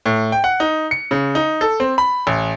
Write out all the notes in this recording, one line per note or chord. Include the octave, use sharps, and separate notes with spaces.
A2
G5
F#5
D#4
C#7
C#3
D#4
A4
C4
B5
A1